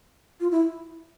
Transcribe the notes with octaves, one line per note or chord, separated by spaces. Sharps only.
F4
E4